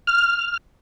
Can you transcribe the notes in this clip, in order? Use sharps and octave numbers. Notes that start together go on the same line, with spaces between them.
F6